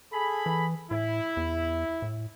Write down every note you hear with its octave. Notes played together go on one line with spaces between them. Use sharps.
G#4 A4 B5
E3
A2 E4
E2
A2